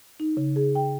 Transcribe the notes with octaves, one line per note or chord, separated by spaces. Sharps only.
D#4
C#3
G#4
G5